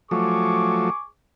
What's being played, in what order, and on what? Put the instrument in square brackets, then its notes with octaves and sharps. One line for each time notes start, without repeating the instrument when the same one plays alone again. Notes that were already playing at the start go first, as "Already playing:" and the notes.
[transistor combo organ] F3 F#3 A3 [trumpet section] G#4 C#6 D6